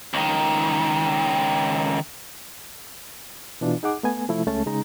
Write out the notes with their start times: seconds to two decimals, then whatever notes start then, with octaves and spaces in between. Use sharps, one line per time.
0.14 C#2 D#3
3.61 B2 E3 D4 F4
3.83 D#4 G#4 F#5 D6
4.03 A3 B3 G#5
4.29 C3 F3 A3 E4
4.47 C#2 G#3 A3 C#4 A5
4.66 C#3 G#3 D#4 A#5